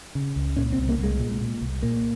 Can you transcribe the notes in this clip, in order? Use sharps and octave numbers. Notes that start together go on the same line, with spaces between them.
C#3
C#2
A#2 C#4
C4
C2
A#3
C2
G#3
A#2
A#2
C2
A#2 A#3